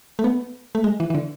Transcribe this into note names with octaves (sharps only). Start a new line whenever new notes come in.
A3
B3
A3
G#3
E3
E3
D3